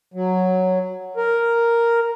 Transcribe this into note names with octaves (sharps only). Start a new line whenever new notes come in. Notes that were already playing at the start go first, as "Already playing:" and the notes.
F#3
A#4